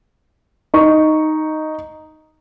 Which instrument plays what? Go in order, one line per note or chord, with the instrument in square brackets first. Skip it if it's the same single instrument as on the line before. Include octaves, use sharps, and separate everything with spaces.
[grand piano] D#4 C#6